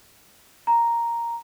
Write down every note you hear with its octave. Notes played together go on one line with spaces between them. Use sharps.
A#5